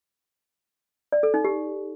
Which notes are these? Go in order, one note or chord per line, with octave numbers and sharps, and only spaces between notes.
D5
A4
D#4
G4